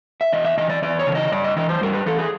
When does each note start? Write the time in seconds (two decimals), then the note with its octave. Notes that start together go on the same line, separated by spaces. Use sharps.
0.21 E5
0.32 E2 D#5
0.45 E5
0.57 C#3 E3 D#5
0.70 D5
0.82 E2 D5
0.99 C#5
1.07 C#3 E3
1.15 D#5
1.32 G2 D5
1.44 D#5
1.56 E3 D#5
1.69 C5
1.81 G2 A#4
1.94 B4
2.06 E3 A4
2.18 G#4